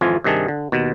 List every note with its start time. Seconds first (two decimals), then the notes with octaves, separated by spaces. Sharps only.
0.01 G#1 F2 E3 F3 F4 G#5
0.24 G2 C3 D#3 G#4 A5
0.48 D3
0.72 D#2 B2